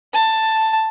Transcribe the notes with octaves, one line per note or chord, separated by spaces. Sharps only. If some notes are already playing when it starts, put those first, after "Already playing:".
A5